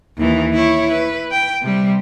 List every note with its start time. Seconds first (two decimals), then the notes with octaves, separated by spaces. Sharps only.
0.17 D#2 E3
0.54 E4 C#5
0.90 B4
1.31 G5
1.62 C3 G3